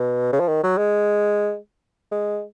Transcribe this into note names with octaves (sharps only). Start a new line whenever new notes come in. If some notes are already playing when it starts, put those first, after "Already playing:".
Already playing: B2
C#3
F3
D#3
F#3
G#3
G#3